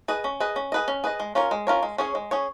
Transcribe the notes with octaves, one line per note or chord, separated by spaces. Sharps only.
G#4 B4 D#5
C#4
G#4 B4 D#5
C#4
G#4 B4 D#5
C#4
G#4 B4 D#5
G#3
C#4 F4 A#4 C#5
G#3
C#4 F4 A#4 C#5
G#3
C#4 G#4 C#5
G#3
C#4 G#4 C#5